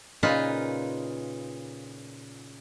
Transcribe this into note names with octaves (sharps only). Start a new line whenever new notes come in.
A#2 C#3 D#4 F4 B4 F5